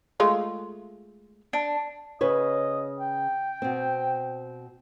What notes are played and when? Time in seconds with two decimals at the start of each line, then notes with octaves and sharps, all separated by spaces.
0.20 G#3 A3 F4
1.53 D4
2.21 C#3 B4 C#5 D#5
3.00 G5
3.62 B2 C4